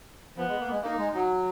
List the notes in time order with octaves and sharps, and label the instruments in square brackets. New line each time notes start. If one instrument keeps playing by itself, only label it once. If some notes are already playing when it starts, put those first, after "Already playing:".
[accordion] F3 [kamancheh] B3
[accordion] G#3
A#3
G#3
[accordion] A#3 [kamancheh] D#4
[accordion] G#3
F#3